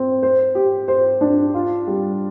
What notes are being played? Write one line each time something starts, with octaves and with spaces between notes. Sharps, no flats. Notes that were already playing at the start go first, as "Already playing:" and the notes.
Already playing: C4
C5
G4
C5
D4
F4
G3